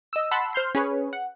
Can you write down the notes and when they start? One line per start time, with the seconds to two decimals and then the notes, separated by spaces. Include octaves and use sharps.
0.13 D#5 E6
0.31 F#5 A5 B5 C6 E6
0.53 C5 F6 G6 C7
0.75 C#4 G#4 B4 C#5
1.13 F#5